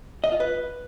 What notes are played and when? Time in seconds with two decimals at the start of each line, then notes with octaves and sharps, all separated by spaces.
0.24 D#5
0.32 F4
0.40 B4